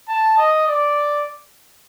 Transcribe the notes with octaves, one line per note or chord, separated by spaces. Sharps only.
A5
D#5
D5